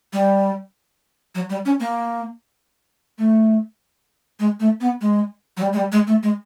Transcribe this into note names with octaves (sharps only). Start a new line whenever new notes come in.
G3
F#3
G3
C#4
A#3
A3
G#3
A3
B3
G#3
F#3
G3
G#3
G3
G#3
A3
G#3